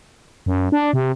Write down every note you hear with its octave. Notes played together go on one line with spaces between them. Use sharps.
F#2
D4
C3